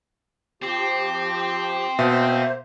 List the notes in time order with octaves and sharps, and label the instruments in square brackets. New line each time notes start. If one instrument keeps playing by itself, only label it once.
[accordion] F3 G4 [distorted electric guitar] C4
[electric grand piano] B2 [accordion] A#3 C5 [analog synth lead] E5